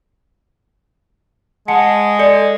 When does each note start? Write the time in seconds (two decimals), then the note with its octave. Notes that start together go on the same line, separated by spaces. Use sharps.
1.68 G#3 F#5 A5 C#7
2.19 A4 D5 C#7